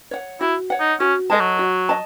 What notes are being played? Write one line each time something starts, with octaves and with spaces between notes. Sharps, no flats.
C#5 F#5
E4 F#4
C#5 F#5
D#4
C#4 F#4
G#3 A4 D#5 A5
F#3
F#4
D#5 A5